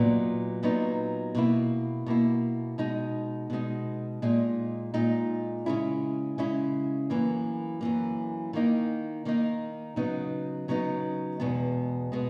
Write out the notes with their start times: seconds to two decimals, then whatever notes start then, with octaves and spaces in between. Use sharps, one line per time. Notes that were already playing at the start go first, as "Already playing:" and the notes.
Already playing: A#2 F#3 B3 D#4
0.63 A#2 F#3 B3 D#4
1.35 B2 A#3 E4
2.06 B2 A#3 E4
2.78 B2 G#3 D#4
3.50 B2 G#3 D#4
4.22 A#2 G#3 D#4
4.94 A#2 G#3 D#4
5.66 C#3 G#3 C#4 E4
6.38 C#3 G#3 C#4 E4
7.10 F#2 E3 A#3
7.81 F#2 E3 A#3
8.53 D#3 A#3 D#4
9.25 D#3 A#3 D#4
9.96 C#3 F#3 B3 D#4
10.68 C#3 F#3 B3 D#4
11.40 E2 B2 G#3 B3
12.12 B2 G#3 B3